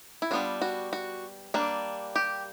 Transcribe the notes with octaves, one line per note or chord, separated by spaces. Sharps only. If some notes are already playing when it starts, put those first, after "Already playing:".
E4
G3 B3 D4 F4
F#4
F#4
G3 A#3 D4
G4